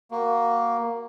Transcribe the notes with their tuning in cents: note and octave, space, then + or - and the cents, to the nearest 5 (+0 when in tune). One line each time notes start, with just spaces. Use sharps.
A#3 +0 F#4 +10